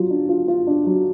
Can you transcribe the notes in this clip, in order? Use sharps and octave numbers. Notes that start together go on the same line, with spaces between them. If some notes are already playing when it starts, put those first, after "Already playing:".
Already playing: F#3 F4
D4
F4
F4
D4
F#3